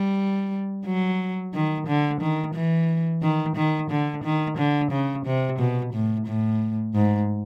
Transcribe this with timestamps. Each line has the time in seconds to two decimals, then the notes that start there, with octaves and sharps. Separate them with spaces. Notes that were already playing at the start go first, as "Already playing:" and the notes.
Already playing: G3
0.85 F#3
1.54 D#3
1.87 D3
2.21 D#3
2.55 E3
3.22 D#3
3.56 D#3
3.91 D3
4.24 D#3
4.58 D3
4.92 C#3
5.26 C3
5.59 B2
5.93 A2
6.27 A2
6.95 G#2